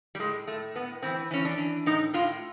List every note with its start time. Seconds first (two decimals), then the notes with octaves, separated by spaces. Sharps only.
0.15 G3
0.19 A2 G#3
0.47 A2 A3
0.75 A2 B3
1.02 E3 C4
1.31 E3 C#4
1.45 D4
1.58 E3
1.86 A2 D#4
2.14 A2 F4